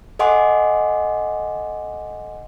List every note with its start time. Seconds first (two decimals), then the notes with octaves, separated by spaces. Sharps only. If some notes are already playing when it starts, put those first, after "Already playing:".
0.19 A4 D#5 F#5 G#5 C6 D6